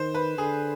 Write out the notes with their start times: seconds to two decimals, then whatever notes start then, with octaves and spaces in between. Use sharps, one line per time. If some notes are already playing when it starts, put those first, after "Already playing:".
Already playing: D#3 C5
0.15 B4
0.38 D3 G#4